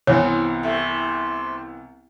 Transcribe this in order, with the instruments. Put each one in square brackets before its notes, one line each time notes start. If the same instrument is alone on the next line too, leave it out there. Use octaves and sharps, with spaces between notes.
[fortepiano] C2 E3 B3 [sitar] C4 [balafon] C#5
[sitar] C3 A3